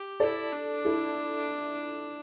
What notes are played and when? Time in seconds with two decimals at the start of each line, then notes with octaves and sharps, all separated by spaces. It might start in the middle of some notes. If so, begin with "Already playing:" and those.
Already playing: G4
0.20 E4 A4 D5
0.52 D4
0.85 E4 A4